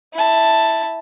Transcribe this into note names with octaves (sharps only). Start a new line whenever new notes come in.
E4 A5